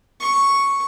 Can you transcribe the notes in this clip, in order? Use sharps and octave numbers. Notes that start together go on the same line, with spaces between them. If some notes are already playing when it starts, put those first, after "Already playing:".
C#6